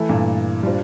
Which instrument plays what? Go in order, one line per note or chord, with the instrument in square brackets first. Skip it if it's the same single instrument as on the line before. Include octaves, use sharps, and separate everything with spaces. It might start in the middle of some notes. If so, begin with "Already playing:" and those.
Already playing: [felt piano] E3 A3 E4 A4
[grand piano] G2 A#2
[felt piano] G3 D4 F4 C5